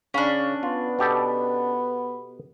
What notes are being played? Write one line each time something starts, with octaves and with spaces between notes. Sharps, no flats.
C#3 C#4 D4
B3 F4
B2 G4 A4